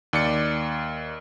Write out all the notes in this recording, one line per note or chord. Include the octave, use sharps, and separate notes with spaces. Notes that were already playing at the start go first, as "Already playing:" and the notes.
D#2 D5 C#7